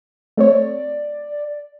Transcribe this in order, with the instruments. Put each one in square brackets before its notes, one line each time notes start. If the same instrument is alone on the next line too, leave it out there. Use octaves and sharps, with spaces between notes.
[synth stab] A3 C4 C#5 [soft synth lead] D5